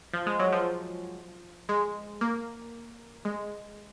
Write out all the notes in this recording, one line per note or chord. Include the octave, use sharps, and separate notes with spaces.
F3
G#3
F#3
F3
G#3
A#3
G#3